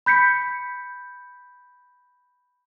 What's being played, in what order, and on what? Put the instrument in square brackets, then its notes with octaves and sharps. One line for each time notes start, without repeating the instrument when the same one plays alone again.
[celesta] B5 G6 B6 C#7